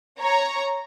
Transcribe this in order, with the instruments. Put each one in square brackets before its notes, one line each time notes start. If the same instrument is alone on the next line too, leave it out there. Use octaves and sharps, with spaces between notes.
[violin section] C#5 A#5